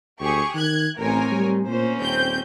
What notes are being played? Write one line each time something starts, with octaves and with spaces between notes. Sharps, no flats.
D2 G4 G#4 C#6
D#3 F#6 G#6
A1 A2 C4 A#4 C#5 G#5
G3
A#2 A#3 C#4 C5
D#1 C4 G6